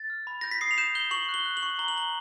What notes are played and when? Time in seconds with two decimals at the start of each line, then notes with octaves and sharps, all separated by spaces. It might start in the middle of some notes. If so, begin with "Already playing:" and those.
Already playing: A6
0.10 F6
0.27 B5
0.41 G6 A#6
0.51 B6
0.61 D#6 C7
0.71 F7
0.78 G6 E7
0.95 G6 G7
1.11 C#6 F#7
1.29 F#6
1.34 G7
1.45 F#6
1.57 F#7
1.63 C#6
1.79 A#5 G7
1.88 F#7
1.96 A#5 G7